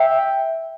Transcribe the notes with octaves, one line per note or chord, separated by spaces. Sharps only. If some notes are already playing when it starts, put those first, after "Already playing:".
Already playing: E5 G5